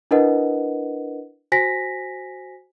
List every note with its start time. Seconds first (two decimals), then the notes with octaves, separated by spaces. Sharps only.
0.11 D4 E4 A#4 B4 D#5 F#5
1.52 F#4 C5 G#5 A#6 B6